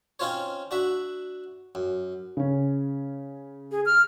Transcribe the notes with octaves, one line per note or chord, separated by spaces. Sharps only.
C4 C#4 D#4 F4 C5 C#5
D4 F#4 E5
F#2
C#3 C#4
G#4
F6